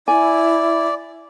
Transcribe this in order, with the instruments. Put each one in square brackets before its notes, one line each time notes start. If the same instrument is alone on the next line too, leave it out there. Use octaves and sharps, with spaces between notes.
[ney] E4 [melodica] D5 [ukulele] G#5